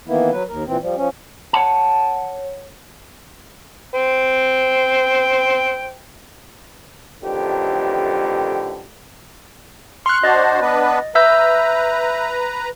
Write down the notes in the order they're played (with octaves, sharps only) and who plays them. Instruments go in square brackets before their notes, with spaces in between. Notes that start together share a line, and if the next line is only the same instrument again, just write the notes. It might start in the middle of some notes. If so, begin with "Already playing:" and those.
[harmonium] D#3 E3 A#3 B3 E4
F#3 B4
D#2 A#4
A#2 E3 C4
F3 G3
F3 C#4
[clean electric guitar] C#5 F#5 A5
[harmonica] C5 G5
[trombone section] A1 F2 A2 D3 D#3 G4
[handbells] C6 F#6 [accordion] C#6 F6
[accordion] D4 F#4 C5 [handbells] D#5 A6
[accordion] B3 D4 B4
[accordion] B4 A#5 [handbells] E5 E6 G6